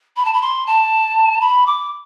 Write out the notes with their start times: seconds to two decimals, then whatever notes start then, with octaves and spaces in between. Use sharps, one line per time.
0.16 B5
0.25 A5
0.33 B5
0.42 C6
0.66 A5
1.41 B5
1.66 D6